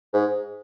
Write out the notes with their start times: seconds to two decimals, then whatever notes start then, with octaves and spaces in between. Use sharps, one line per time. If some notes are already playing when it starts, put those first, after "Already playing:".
0.14 G#2